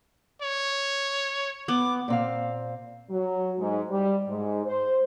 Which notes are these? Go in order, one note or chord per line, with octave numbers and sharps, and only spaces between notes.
C#5
B3 D6
A#2 C4 F5
F#3
G#2
G3
G#2
C5